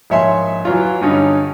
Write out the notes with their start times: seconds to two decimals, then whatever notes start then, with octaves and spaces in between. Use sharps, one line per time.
0.10 A#1 G#2 C#5 E5 G#5 C6
0.65 E3 F#3 F4
1.01 G2 D3 C#4 D#4